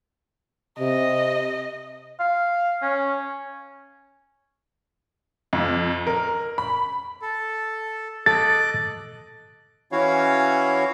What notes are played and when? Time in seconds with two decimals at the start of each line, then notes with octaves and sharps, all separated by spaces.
0.79 C3 D#5
2.20 F5
2.82 C#4
5.53 F2
6.07 A#4
6.58 B5
7.22 A4
8.26 A4 D#5 D6 F#6 A6
9.92 E3 C#4 E4 F#4 C#5 F5